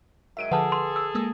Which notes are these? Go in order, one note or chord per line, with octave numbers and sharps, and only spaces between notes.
G#2 D#3 F#3 E5 D7 D#7
D3 F3 G#4 A4 B4 F#5 A5
C6
E6
G#3 A#3 D#6